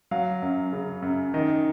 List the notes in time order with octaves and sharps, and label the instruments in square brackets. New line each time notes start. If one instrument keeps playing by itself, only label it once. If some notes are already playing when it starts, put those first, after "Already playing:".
[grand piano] F#3 F5
F#2
C#3
F#2
D#3 D#5